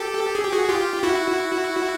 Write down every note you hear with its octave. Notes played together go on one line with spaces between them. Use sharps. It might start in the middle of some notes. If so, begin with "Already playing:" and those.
Already playing: G4 A4
G#4
G4
F#4 G#4
F4 G4
E4 F#4